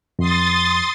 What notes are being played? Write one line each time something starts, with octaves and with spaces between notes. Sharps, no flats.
F2 C6 D#6 A6